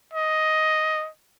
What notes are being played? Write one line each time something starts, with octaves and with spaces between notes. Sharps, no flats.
D#5